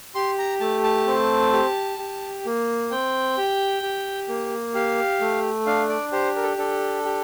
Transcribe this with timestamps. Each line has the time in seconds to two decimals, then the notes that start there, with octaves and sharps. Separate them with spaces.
0.15 G4 C6
0.39 A#5
0.60 A3 A5
0.84 A5
1.07 C4
1.52 G4
1.99 G4
2.45 A#3
2.91 C4 G5
3.37 G4
3.83 G4
4.28 A#3
4.74 G4 F5
5.21 A3
5.66 D4 F5
5.89 D5
6.12 G4 C5
6.36 A#4
6.43 A4
6.58 D4 A4
7.05 G4